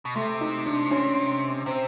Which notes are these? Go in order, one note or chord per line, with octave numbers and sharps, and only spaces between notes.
B2
C3 A3
D#4
D4
C#4
C3 C4